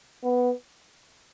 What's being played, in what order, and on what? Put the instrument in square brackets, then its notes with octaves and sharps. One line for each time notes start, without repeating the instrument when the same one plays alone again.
[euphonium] B3